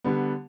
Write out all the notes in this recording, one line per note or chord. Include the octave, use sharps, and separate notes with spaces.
D3 G3 B3